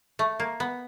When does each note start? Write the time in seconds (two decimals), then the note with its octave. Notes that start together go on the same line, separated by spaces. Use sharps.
0.19 A3
0.40 A#3
0.60 B3